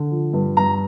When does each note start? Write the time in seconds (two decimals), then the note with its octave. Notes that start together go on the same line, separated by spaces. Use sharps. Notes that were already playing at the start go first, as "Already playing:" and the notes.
Already playing: D3
0.11 F3
0.33 G2
0.57 G2 A#5